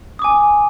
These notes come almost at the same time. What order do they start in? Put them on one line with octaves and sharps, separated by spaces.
D#6 D6 G#5